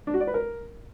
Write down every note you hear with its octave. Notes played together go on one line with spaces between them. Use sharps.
D4
F#4
D5
B4
A#4